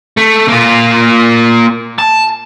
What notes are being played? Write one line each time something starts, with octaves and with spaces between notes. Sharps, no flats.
A3
A#3 F4
A5